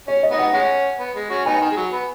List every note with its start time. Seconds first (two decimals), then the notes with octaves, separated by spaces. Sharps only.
0.08 C#4 C#5
0.23 D#5
0.31 B3 D#4
0.39 F#5
0.53 G#3 C#4 F#5
1.00 B3
1.15 G#3
1.30 C#4 F#4
1.46 B3 D#4 G#5
1.61 D#3
1.72 G#3
1.77 F#3
1.92 B3